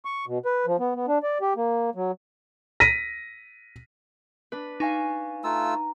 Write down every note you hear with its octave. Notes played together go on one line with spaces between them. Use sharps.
C#6
B2
B4
F3
B3
B3
D4
D5
G4
A#3
F#3
A#6 B6 D#7
D4 B4
D#4 F5 G#5 C#6
A3 F4 A#5 E6